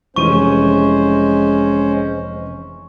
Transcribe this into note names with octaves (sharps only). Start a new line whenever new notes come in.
F1 E3 G#3 C#4 C5 C#6 D#7